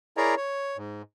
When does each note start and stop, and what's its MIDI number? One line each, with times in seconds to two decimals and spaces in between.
0.17 0.35 64
0.17 0.35 68
0.17 0.35 70
0.17 0.35 73
0.17 0.35 74
0.17 0.35 82
0.37 0.77 73
0.77 1.02 44